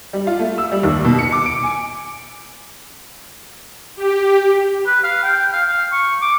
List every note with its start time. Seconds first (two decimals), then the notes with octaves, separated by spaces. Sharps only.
0.13 G3
0.27 F4
0.40 A3
0.58 E6
0.72 G3
0.83 D#2
1.04 B2
1.19 C#7
1.32 D6
1.46 D7
1.63 G#5
3.95 G4
4.86 B4
5.04 F5
5.23 G5
5.53 F5
5.68 F5
5.92 C#6
6.22 D6